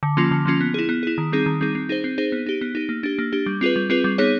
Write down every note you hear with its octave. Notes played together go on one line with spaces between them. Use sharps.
D3
F3 A#3 C#4 F4
D3
F3 A#3 C#4 F4
B3
E4 G#4
B3
E4 G#4
D#3
G3 C4 D#4 G#4
D#3
G3 C4 D#4 G#4
C4
D#4 G#4 C5
C4
D#4 G#4 C5
B3
D#4 G4
B3
D#4 G4
A#3
D4 G4
A#3
D4 G4
G3
C4 F4 G#4 B4
G3
C4 F4 G#4 B4
G3
B3 D#4 G#4 C#5